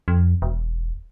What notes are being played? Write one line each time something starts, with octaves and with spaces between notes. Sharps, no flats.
F2
E1